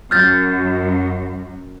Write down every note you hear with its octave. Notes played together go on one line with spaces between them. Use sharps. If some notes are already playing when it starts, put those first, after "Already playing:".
F#2 F6 G6 A6